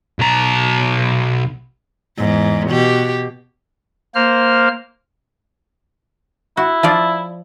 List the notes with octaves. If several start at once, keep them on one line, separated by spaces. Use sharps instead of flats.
B1 A#5
E2 G#2
B2 G4
A#3 C5 F6
E4 F#4
F3 F4 D5